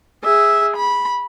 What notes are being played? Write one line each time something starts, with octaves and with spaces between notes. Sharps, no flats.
G#4 E5
B5